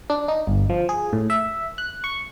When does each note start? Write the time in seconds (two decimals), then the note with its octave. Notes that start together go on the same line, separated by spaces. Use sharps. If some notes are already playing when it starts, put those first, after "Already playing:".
0.10 D4
0.28 D#4
0.47 G1
0.70 F3
0.89 G#4
1.13 A2
1.30 E5
1.78 F#6
2.04 C#6